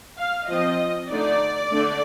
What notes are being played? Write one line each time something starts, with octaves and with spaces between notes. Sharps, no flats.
F5
F3 C4 F4 D#5
D3 A3 D#4 D5
D3 A3 D4